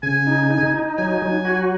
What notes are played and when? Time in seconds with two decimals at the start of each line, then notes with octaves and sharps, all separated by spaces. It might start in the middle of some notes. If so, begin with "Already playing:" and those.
0.03 C#3 G#5
0.27 D#4
0.51 D#4
0.74 D#4
0.98 F#3 G#5
1.22 F#3
1.45 F#4